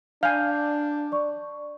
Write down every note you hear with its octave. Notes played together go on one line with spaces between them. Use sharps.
D4 F5 G#5 G6
D5 C#6